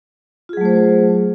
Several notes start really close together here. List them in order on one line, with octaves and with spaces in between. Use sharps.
F4 G#4 F#3 A3 C5